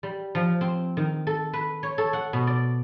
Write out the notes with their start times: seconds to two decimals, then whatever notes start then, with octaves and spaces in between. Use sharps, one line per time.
0.03 G3
0.35 F3
0.61 C4
0.97 D#3
1.27 A4
1.53 B4
1.83 C#5
1.98 A4
2.13 F#5
2.33 B2
2.47 D5